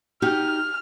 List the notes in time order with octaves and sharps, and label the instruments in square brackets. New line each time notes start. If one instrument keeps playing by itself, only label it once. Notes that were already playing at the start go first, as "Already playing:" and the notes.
[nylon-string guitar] D#4 F#4 G4 [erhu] F6